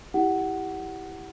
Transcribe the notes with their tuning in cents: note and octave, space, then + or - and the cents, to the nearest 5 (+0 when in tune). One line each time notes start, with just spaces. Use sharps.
E4 +0 G4 +0 F#5 +15